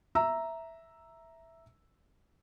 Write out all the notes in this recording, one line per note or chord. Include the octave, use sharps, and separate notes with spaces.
E5 A#5 E6